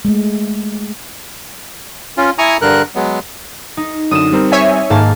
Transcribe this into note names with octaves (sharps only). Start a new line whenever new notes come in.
G#3 A3
C#4 F4
E4 G#5 A#5 C#6 D#6
G2 D3 A#4 F#6
F#3 G#3 B3
D#4
F#2 D3 D#6 E7
G3 C4 A#4
C#5 E5 G#5
G#2 D#3 A#3 D#4 F5 A5